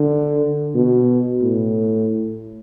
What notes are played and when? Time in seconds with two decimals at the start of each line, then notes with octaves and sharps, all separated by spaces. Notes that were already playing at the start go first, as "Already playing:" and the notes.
Already playing: D3
0.75 B2
1.42 A2